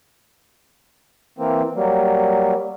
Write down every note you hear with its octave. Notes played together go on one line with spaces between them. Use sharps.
E3 A#3 C4
F#3 G3 A#3